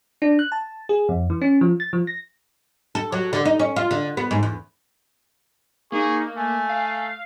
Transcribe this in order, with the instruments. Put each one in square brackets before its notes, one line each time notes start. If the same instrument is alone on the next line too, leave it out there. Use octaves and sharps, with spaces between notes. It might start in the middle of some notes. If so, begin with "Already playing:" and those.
[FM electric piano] D4
F#6
A5
G#4
F2
E3
C#4
F3
A6
F3
A#6
[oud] A4
F#3
D3
D#4
C#4
F4
D3
B3
G#2
E2
[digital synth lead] A#3 [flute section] D#4 C#6 [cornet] G#4
[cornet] A3 [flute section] G#5
[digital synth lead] F5